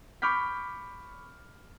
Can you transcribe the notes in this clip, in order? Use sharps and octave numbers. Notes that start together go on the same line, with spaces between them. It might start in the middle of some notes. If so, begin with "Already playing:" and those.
B5 C#6 D6 F6 G6 B6